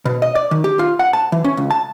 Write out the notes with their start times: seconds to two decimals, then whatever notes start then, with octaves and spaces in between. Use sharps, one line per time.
0.05 B2
0.22 D#5
0.35 D5
0.51 D#3
0.64 G4
0.79 F4
0.99 F#5
1.13 A5
1.32 E3
1.44 C#4
1.57 C#2
1.70 A5